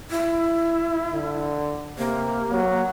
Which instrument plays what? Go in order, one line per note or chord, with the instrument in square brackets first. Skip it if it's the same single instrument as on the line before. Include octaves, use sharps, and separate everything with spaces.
[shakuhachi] E4
[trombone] D3
[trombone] C3 [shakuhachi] A#3
[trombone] F#3